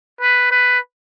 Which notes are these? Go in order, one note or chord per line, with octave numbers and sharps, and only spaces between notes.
B4
B4